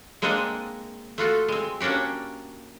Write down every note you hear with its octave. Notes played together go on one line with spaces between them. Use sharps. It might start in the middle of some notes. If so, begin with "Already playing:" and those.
G#3 A#3 C4 D4 D#5 F#5
A3 F4 F#4 A4
G#3 C4
A#3 C#4 D4 F#4 G4